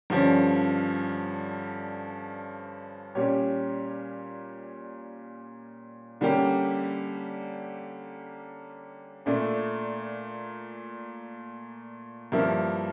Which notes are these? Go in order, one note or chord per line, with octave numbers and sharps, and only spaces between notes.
G2 D3 F3 C#4
A#2 G3 C#4 G4 C#5
D3 G3 A#3 C#4 G4
A#2 A3 D4
G2 F3 A#3 E4 A#4